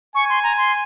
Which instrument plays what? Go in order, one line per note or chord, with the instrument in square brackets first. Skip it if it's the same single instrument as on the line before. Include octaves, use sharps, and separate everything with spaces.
[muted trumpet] G#5 [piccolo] C#6
[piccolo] C6
A#5
C6